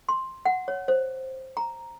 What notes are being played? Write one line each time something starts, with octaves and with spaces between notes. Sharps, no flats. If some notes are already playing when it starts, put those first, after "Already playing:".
C6
F#5
C#5
C5
A#5